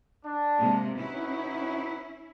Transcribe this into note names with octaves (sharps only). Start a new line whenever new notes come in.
D4
C3 G#3 A#3
C#4 D#4 E4 F#4 B4